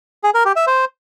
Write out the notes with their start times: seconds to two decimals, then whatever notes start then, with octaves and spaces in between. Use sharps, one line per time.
0.24 G#4
0.34 A#4
0.45 G4
0.56 E5
0.67 C5